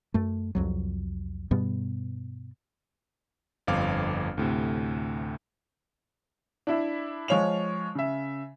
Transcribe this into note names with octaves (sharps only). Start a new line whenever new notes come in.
F#2 A3
C2 F2 F#3
G2 B2 G3 B3
G1 F2 C4 F5 D6 F6
D2 A2 C3
D4 E4 E5
F3 G#3 C#5 F5 F7
C#3 E5